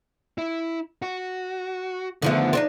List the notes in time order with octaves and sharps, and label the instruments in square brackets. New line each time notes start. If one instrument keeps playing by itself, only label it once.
[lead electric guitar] E4
F#4
[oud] D3 F3 A3 [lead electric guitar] D#3 B3
[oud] C4 D4 D#4